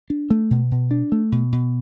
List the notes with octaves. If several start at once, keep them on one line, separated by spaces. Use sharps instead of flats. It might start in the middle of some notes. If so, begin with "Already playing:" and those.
D4
A3
B2
B2
D4
A3
B2
B2